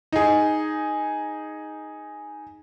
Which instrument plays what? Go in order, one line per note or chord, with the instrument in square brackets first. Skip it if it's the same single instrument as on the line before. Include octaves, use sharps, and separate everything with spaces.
[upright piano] D#4 G#4